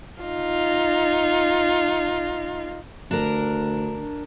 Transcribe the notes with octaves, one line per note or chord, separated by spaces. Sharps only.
D#4 F4
D2 D4 A#4